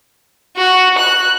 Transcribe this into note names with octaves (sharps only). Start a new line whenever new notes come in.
F#4
F#6